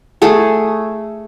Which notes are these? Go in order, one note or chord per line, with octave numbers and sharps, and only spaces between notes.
A3 G#4 A4